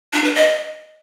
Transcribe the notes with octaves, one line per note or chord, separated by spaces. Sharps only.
D4
B4
D#5